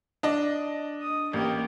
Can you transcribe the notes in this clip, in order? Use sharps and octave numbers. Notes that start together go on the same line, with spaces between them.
D4 D#5
D#6
A1 A#3 G4